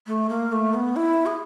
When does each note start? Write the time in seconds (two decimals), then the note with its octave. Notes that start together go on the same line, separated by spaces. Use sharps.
0.07 A3
0.29 A#3
0.52 A3
0.74 B3
0.96 E4
1.26 G#4